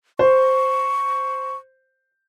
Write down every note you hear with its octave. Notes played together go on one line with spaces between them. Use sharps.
C5 C#6